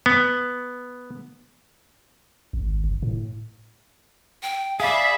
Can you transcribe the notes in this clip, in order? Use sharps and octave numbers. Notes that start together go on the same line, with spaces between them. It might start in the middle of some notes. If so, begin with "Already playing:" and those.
B3
G#1
F#1
A2
G5
G#4 D5 E5 F5 B5